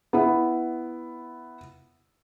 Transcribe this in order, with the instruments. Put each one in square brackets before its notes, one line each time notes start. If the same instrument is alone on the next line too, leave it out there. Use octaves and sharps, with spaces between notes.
[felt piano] B3 E4